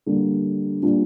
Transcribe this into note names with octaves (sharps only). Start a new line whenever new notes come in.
D3 G3 A#3
A#2 G3 D4 F4